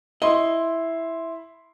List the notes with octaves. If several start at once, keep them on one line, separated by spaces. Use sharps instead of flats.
E4 D#5 C6